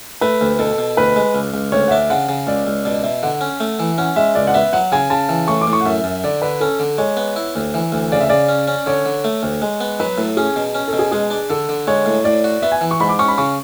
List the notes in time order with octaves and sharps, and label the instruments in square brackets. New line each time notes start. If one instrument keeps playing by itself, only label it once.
[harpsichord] A3 [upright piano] B4
[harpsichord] D2
[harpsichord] B2 [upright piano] A4
[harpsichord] B2
[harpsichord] D2 [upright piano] B4
[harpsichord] G#3
C#2
C#2
[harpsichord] D2 [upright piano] C#5
[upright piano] F#5
[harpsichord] D4 [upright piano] E5
[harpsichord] C#3 [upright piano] F#5
[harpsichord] C#3
[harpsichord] C#2 [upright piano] D5
[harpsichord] C#2
[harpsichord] B2 [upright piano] D5
[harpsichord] B2 [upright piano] E5
[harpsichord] D3 [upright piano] F#5
[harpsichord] C#4
A3
E3
[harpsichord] C#4 [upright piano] F#5
[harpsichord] G#3 [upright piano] E5
[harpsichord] C#2 [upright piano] D5
[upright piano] F#5
[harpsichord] B3 [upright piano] E5
[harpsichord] F#3 [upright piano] F#5
[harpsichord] C#3 [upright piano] G#5
[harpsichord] C#3 [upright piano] A5
[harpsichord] E3
[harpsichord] A2 [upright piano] C#6
[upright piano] D6
[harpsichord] A2
[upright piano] C#6
F#5
[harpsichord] F#2 [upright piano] E5
[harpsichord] F#2
[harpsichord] D3 [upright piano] D5
[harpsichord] D3 [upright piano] B4
[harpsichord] C#4 [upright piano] A4
[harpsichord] D3
[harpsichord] G#3 [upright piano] C#5
[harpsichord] B3
E4
D2
E3
D2
[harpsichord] C#3 [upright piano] D5
[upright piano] E5
[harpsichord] C#3 [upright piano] D5
[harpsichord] C#4
C#4
[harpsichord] D3 [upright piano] C#5
[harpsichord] D3
A3
D2
G#3
B3
[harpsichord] F#3 [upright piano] B4
[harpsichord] A2 [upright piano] A4
[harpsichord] C#4 [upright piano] G#4
[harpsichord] B2
C#4
[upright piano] A4
[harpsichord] B2
[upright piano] G#4
[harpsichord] G#3 [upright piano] G#4
[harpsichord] D4
[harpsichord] D3 [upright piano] A4
[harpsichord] D3
[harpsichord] G#3 [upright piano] C#5
[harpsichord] A2
[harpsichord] A2 [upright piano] D5
[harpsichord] F#4
[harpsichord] B3 [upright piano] E5
[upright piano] G#5
[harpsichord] E3
[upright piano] C#6
[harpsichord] G#2 [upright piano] B5
[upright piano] D6
[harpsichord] C#4 [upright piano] C#6
[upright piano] B5
[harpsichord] C#3 [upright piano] C#6